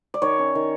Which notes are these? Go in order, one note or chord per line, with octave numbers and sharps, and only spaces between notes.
D5
D#3 C#5
C#4
D#3